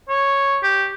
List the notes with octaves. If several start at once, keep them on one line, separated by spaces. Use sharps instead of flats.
C#5
G4